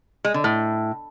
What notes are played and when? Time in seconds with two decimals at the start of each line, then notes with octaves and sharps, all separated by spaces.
0.25 G#3
0.34 D3
0.44 A2